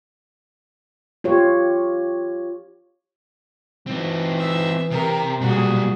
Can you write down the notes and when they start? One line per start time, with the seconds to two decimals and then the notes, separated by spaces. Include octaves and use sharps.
1.24 F4 G4 C#5
3.87 E3 C4 D#4
4.39 E5
4.91 C3 A#4
5.41 B1 A#2 G3 F#4 G#4